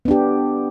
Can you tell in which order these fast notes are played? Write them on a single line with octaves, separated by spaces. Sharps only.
B3 D4 G4